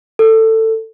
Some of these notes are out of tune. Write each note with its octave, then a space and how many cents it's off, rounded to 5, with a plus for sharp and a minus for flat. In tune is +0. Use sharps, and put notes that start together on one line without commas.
A4 +20